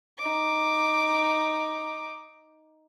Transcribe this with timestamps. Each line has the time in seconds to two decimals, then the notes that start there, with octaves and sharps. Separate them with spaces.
0.18 D#4 D6